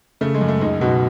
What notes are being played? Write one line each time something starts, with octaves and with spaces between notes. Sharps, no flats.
C#3 A3
G#3
F#2
A3
C#2 D#4
B2 F#4